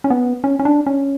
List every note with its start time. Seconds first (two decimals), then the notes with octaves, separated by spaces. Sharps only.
0.04 C#4
0.10 B3
0.44 C#4
0.59 C#4
0.65 D4
0.86 C#4